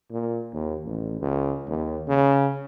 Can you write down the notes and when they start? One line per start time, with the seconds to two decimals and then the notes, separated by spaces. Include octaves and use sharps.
0.11 A#2
0.53 D#2
0.85 A1
1.21 C#2
1.67 D#2
2.08 C#3